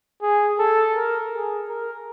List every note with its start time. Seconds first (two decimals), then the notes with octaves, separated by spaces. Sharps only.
0.22 G#4
0.59 A4
0.95 A#4
1.33 G#4
1.69 A#4